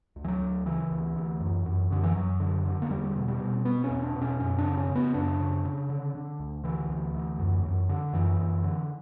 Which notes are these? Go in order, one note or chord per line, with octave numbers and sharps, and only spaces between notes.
D2
E3
F#3
D2
C#3 E3
D2
D2
F#2
F#2
F#2 D3
E3
F#2 F#3
D3
D3
A#3
E2 G3
B2
G3
B2
B2 B3
C#4
E2
D4
B2
C#4
F#2 C#4
D4
C#3
C#4
C#3
B3
F#2 D4
C#3
C#3
D3
D3
D2
D3 E3
D2
D2
F#2
F#2
D3
F#2 E3
F#2
D3